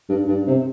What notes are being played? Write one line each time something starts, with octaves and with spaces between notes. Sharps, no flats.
G2
G2
C3